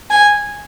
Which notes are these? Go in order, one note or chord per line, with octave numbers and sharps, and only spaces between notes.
G#5